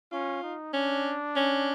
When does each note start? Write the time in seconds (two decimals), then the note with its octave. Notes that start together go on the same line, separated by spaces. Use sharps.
0.12 C#4 F4
0.44 D#4
0.74 C#4 D4
1.36 C#4